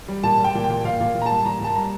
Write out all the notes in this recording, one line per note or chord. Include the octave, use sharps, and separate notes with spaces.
G3
A#2 A5
G3
G5
A#2
G5
A#2
A#2 F5
A#2
A#2
A#5
G3 A5
A#2 A#5
A#2 A5
G3 A#5